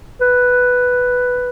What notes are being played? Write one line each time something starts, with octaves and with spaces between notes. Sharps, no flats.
B4